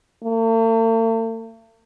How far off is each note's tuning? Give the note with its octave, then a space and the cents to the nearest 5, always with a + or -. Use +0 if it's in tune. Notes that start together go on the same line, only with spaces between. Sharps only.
A3 +45